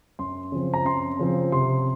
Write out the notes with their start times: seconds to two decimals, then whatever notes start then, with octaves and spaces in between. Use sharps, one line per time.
0.19 F#2 C6
0.52 C#3 F3 C4
0.74 A#5
0.85 F#2 C6
1.19 C#3 F3 C4
1.52 C3 C6